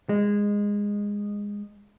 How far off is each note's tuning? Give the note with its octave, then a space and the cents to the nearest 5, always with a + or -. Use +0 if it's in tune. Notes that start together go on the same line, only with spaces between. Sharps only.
G#3 -15